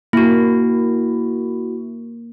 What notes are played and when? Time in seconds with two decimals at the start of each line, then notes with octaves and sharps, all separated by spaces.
0.13 A#3 E4 F#4